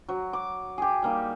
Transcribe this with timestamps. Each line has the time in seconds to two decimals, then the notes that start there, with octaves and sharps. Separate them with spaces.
0.09 F#3
0.33 D6
0.78 G4 G#4
1.02 G3 A#3 D#4